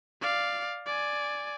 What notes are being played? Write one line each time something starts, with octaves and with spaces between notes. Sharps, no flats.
D5 F5
D5 G#5